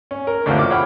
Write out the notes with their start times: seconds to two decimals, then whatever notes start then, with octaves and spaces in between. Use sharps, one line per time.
0.11 C#4
0.27 A#4
0.46 A1 D2 D3 F4 C5
0.59 D6 F6
0.71 C#5 F#5 G5 B5 F6